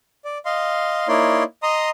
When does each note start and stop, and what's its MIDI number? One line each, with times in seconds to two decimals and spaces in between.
0.25 0.38 74
0.45 1.08 75
0.45 1.08 77
0.45 1.08 84
1.08 1.43 58
1.08 1.43 63
1.08 1.43 64
1.08 1.43 73
1.08 1.43 74
1.08 1.43 84
1.63 1.90 75
1.63 1.90 82
1.63 1.90 84
1.63 1.90 87